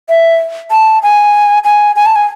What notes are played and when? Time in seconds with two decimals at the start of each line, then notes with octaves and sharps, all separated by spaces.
0.09 E5
0.71 A5
1.03 G#5
1.64 G#5
1.96 G#5
2.06 A5
2.15 G#5